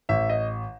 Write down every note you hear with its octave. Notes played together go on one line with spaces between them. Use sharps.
A1 E5
D#5